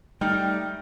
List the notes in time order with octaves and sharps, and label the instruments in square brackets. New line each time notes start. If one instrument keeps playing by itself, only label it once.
[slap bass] G3 [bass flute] A3 [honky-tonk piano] D#4 [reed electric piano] G5 F6